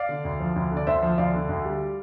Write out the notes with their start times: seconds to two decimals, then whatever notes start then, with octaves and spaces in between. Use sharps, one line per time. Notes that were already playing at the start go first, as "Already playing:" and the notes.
Already playing: D5 F5
0.09 D3
0.25 D2
0.40 F3
0.56 D2
0.71 D3
0.77 D5
0.87 D2 C5 E5
1.02 F3
1.18 D2 D5 F5
1.34 D3
1.49 D2
1.65 G3